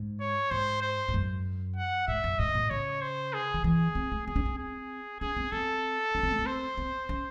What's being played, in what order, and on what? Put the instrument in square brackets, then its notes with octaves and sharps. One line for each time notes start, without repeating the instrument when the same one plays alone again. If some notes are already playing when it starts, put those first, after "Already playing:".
Already playing: [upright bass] G#2
[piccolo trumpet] C#5
[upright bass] G#2 [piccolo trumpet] C5
[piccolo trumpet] C5
[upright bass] G#2
F#2
[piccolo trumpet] F#5
[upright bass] G#2 [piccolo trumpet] E5
[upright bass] F#2
[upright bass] G#2 [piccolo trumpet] D#5
[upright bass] G#2
A2
[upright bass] C#3 [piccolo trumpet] C#5
[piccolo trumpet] C5
G#4
[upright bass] D#3
[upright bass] E3 [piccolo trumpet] G#4
[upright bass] C4
A3
[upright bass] C4 [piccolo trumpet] G#4
[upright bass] C#4
C4
[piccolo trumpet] G#4
[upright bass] C#4 [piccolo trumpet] G#4
[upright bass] C4
[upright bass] C4 [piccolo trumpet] A4
[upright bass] C#4
C4
A3
C4
[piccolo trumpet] C5
[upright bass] C4
C#4